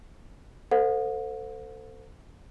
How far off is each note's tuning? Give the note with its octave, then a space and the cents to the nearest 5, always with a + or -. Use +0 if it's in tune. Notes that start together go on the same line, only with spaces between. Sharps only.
A4 +30 C5 -20 F#5 -45